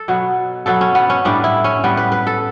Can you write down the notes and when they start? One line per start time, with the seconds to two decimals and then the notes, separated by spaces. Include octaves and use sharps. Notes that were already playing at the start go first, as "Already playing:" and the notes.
Already playing: A4
0.08 B2 F#3 B3
0.66 B2 F#3 B3 A4
0.81 C#4
0.95 B3
1.10 C#4
1.25 A2 G3 B3 D4
1.44 E4
1.64 C#4
1.84 A2 G3 B3
1.97 B4
2.12 B4
2.27 A4